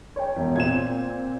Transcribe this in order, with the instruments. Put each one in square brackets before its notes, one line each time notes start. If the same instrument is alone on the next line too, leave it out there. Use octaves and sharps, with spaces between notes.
[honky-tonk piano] C#5 G5
[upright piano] E1
[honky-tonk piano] A#2 C4 [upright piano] G#6 E7